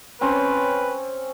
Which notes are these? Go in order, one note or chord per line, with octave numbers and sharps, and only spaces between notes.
C4 C#4 B4 C#5